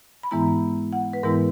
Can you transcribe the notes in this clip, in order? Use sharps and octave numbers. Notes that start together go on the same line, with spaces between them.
B5
G#2 E3 G#3 B3 E4 A#5
F#5
B4
G#2 E3 G#3 B3 E4 A#4